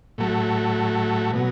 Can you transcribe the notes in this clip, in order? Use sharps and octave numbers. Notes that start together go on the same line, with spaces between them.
A2 F#3 A3
B2 F#3